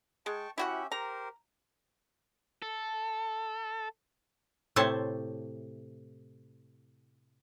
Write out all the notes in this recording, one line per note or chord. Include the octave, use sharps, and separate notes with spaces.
G#3 G5 A5 C#6
C#4 E4 F#4 G4 E5 F#5
G4 A#4 C5 A#5
A4
A2 C3 A3 C5 C#5 A5